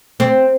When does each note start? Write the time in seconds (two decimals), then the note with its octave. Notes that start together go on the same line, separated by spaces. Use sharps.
0.20 C4